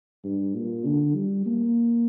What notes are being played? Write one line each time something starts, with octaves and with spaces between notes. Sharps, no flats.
G2
A#2
D3
G3
A#3